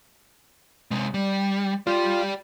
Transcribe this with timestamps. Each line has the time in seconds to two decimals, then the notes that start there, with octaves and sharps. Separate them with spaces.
0.91 C3 G#3
1.14 G3
1.87 F4 G4 D5